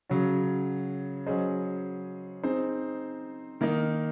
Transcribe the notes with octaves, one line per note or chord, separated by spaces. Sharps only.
C#3 F#3 C#4 F#4
F#3 C#4 G#4 C5 D#5
C4 D#4 G#4 C5
D#3 A#3 D#4